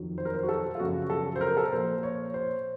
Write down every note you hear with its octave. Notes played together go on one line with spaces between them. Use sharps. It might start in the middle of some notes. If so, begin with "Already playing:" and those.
Already playing: F2 D#3 F#3
C5
A#4
C5
F#4
A4
F4
F#2 C#3 F3 F#4
A4
C5
A#4
A4
A#4
A#2 F3 C5
C#5
C5